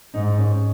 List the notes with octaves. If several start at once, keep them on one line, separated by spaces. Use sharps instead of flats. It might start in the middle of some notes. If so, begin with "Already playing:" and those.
G#2 D#4
C#4